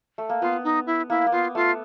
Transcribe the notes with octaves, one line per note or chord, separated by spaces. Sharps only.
A3
A#3
B3 F4
D#4
E4
A#3 E4
A#3
B3 F4
A3 F4